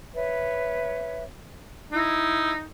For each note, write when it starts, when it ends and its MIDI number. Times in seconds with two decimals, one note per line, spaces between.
0.15 1.25 71
0.15 1.25 73
0.15 1.25 76
1.92 2.64 63
1.92 2.53 64